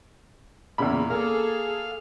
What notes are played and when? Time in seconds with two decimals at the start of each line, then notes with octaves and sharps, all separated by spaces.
0.78 E2 A#2 C#3 B5
1.10 A#3 G#4 A4 F5